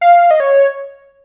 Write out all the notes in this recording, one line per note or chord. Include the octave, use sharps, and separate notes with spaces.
F5
D#5
C#5